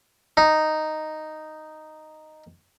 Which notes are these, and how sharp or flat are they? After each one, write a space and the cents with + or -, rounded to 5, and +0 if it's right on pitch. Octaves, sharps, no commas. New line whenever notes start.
D#4 -5